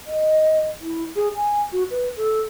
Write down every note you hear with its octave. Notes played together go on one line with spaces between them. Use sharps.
D#5
E4
G#4
G#5
F#4
B4
A4